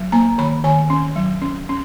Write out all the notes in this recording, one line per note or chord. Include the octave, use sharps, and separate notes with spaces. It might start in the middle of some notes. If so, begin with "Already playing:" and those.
Already playing: F#3
A#3 A#5
D#3 B5
D#3 G#5
C#4
F#3
C#4
C#4